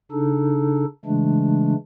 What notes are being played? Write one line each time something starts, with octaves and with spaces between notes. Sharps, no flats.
C#3 D4 D#4 A4
C#3 E3 G#3 A3 D4